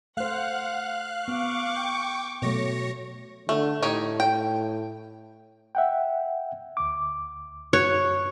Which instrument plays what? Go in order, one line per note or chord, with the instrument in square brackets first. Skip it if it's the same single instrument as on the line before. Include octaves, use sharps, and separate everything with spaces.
[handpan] A3 C5 [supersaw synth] F5 F#6 [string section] F#5
[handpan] B3 [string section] C#6 D6
[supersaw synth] G5
[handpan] B2 F#3 A3 [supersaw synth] C#5 A#6 C#7
[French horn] D3 [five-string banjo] A3
[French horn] A2 [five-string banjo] D#4 G4 C#5
[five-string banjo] G5
[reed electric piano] E5 F#5 G5
D2 D6
[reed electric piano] F#2 F#4 F#6 [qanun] C#5